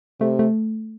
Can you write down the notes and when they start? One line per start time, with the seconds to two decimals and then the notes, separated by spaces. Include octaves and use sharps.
0.21 C3 A3
0.39 A3